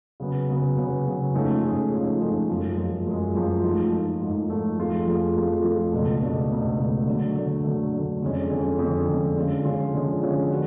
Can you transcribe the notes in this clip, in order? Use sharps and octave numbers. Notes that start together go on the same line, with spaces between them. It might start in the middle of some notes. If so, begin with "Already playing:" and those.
C#3 F#3 B3
C#3 F#3 B3
C#3 F#3 B3
C#3 F#3 B3
G#2 F3 A3 C#4 G#4
G#2 F3 A3 C#4 G#4
G#2 F3 A3 C#4 G#4
G#2 F3 A3 C#4 G#4
F#2 F3 G#3
F#2 F3 G#3
F#2 F3 G#3
F#2 F3 G#3
G#2 F3 A3
G#2 F3 A3
G#2 F3 A3
G#2 F3 A3
F2 F3 A3 F4 G#4
F2 F3 A3 F4 G#4
F2 F3 A3 F4 G#4
F2 F3 A3 F4 G#4
C#2 B2 A3 D4
C#2 B2 A3 D4
C#2 B2 A3 D4
C#2 B2 A3 D4
D3 F#3 A3
D3 F#3 A3
D3 F#3 A3
D3 F#3 A3
F2 D3 G#3 C#4
F2 D3 G#3 C#4
F2 D3 G#3 C#4
F2 D3 G#3 C#4
D3 F3 G#3 C#4 F4
D3 F3 G#3 C#4 F4
D3 F3 G#3 C#4 F4
D3 F3 G#3 C#4 F4
B3 F#4